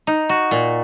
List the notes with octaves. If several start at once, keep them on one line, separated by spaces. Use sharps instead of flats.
D#4
F#4
A#2